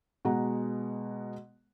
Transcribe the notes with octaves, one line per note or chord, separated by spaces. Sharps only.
B2 G#3 F#5 A#5